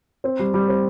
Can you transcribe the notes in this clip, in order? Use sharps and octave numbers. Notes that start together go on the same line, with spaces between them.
C4
G3
G3
C4